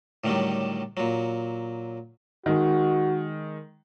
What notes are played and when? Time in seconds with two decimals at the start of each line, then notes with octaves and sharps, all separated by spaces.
0.24 A2 D3 D#3 F#3 G3
0.97 A#2 F#3
2.46 D#3 G#3 F#4